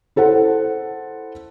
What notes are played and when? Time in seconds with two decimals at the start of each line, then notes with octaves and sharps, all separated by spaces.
0.16 E4 A4 C5 F#5